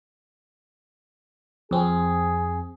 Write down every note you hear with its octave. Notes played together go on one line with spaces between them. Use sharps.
F2 C4 G#4